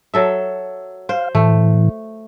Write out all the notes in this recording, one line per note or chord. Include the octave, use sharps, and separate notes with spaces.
F#3 A4 E5
C5 F5
A2 E3 A3